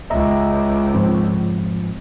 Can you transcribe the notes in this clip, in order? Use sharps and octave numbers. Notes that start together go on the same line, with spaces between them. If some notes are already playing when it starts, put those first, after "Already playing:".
C#2 D#5 E5 A#5
G#2 F3 C4